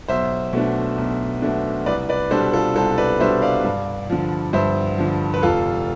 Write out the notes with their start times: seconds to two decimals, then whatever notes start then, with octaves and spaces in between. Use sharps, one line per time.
0.08 B1 C5 E5
0.53 B2 A3 D4
0.98 B1
1.42 B2 A3 D4
1.86 C2 B4 D5
2.09 B4 D5
2.31 B2 G3 D4 A4 C5
2.53 F4 A4
2.76 C2 A4 C5
2.98 B4 D5
3.20 B2 G3 D4 C5 E5
3.42 D5 F5
3.64 G2
4.10 D3 F3
4.53 G2 C5 E5
4.98 D3 F3
5.34 B4
5.42 F1 F4 A4